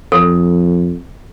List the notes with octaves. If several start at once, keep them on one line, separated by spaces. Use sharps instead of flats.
F2 A4